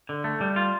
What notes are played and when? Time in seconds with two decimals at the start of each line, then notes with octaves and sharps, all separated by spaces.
0.09 D3
0.24 A3
0.41 G3
0.56 F4